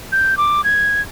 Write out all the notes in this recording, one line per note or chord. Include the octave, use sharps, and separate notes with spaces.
G6
D6
G#6